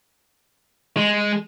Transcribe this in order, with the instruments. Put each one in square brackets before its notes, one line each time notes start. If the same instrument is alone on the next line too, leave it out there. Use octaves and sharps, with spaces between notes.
[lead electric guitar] G#3